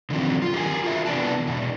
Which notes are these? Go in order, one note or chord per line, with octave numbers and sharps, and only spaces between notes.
D3 D#3 F3 F#3 C4
F4
G4 G#4 A#4 D#5 G#5
F4 F#4 A#4 E5
C3 E3 B3 D4 G5 A5
B2 E3